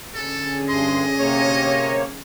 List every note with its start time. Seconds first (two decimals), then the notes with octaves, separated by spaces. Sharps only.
0.14 D3 C#4 G#4 A4
0.69 G2 D#5 C6
1.19 C3 A#3 C#5